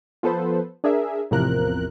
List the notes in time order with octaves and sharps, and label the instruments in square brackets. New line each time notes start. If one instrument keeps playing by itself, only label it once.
[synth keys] F3 B3 A4 B4 C5
D4 G#4 A#4 E5
A1 E2 C3 F3 A#4 F#6